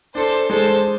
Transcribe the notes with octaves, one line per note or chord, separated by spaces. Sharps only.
D4 A4 C5
G#3 A4 C5